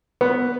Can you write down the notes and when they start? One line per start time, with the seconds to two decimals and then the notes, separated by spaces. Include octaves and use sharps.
0.21 B3